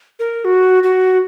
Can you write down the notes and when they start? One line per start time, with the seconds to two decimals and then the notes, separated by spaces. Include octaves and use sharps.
0.19 A#4
0.45 F#4
0.83 F#4